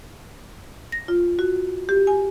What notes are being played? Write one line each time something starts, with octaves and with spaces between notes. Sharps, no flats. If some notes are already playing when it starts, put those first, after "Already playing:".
A#6
F4
F#4
G4
G#5